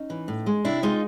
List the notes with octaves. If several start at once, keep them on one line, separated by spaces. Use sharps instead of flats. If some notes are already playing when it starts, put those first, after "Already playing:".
Already playing: C#4 D#4
E3
A2
G#3
C3 D4 E4
G#3 D#4 F4